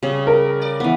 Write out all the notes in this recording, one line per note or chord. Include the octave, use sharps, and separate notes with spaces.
C#3 G3 G#4
A#4
D5
E3 B3